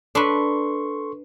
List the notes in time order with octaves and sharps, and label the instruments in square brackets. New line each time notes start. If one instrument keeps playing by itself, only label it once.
[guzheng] D4 B4 [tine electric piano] A4 C6 C#6